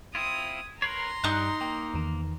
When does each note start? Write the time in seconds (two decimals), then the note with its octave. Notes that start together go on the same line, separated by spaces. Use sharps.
0.15 C4 E4 F4 D#6 G#6
0.82 A#4 B4 C#5 A#5 C6 C7
1.24 G2 G3 D#4 F#6
1.61 A#3 G5
1.94 E2 D#3